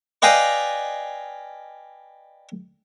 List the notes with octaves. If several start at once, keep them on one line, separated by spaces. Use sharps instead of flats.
B4 D5 D#5 F5 G5 G#5